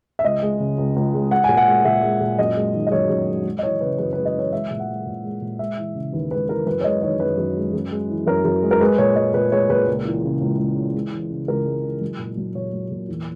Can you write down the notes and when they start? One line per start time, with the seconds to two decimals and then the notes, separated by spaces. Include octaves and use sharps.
0.19 E5
0.24 C#2 D#5
0.42 G#3
0.60 C#3
0.78 C#2
0.96 C#2
1.14 G#3
1.31 G#3 F#5
1.44 A#2 G#5
1.57 F#5
1.67 G#3
1.85 A#2 E5
2.02 G#3
2.20 A#2
2.39 F#2 D#5
2.56 G#3
2.74 D#3
2.87 D#5
2.92 F#2 C#5
3.09 F#2
3.27 G#3
3.46 G#3
3.59 D#5
3.63 E3 C#5
3.81 C#3 B4
3.98 F#2 B4
4.13 B4
4.17 G#3
4.25 D#5
4.35 E3 C#5
4.53 G#3 E5
4.70 A#2
4.80 F#5
4.88 G#3
5.06 A#2
5.24 G#3
5.41 A#2
5.59 G#3 E5
5.78 E3
5.95 C#3
6.13 D#2 B4
6.31 G#3 B4
6.49 E3 A#4
6.66 F#2 B4
6.81 C#5
6.84 G#3 D#5
7.02 D#3 C#5
7.20 F#2 B4
7.37 F#2
7.56 G#3
7.73 F#2
7.91 G#3
8.10 E3
8.27 F#2 A#4
8.45 F#2
8.62 G#3
8.71 A#4
8.80 G#3 B4
8.98 A#2 C#5
9.16 G#3 D#5
9.34 A#2 B4
9.52 G#3 C#5
9.69 A#2 B4
9.87 C#2
10.05 E3
10.24 C#3
10.41 C#2
10.59 C#2
10.76 E3
10.95 G#3
11.12 E3
11.30 C#3
11.48 C#2 A#4
11.65 G#3
11.83 E3
12.01 F#3
12.19 A#2
12.37 F#3
12.54 A#2 C#5
12.73 F#3
12.91 A#2
13.09 E2